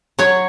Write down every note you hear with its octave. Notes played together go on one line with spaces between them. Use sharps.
F#3 C#5